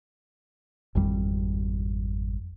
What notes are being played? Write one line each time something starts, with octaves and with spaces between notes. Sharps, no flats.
G#1 F2 G3